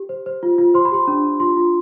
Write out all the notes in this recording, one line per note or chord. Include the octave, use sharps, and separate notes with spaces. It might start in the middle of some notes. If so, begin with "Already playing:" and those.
Already playing: G4
C5
C5
F4
F4
C5 C6
B5
G4 C6
D4
D4
F4 C6
F4